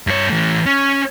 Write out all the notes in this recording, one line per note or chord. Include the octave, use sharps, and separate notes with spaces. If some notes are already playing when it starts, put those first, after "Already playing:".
G2 C#5
E3 A3
C#4